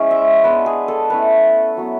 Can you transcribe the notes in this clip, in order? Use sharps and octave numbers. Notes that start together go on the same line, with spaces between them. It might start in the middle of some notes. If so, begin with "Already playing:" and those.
Already playing: G#3 C#4 E4 C#5
E5
G#3 B3 D4 B4
G#4
A4
A3 C#4 E4 B4
F#3 B3 E4